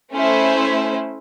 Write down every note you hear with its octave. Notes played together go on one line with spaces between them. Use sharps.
A3 C#4 E4 C5